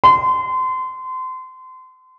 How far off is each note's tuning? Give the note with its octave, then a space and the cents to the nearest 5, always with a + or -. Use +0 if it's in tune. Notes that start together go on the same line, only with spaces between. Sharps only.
C6 -30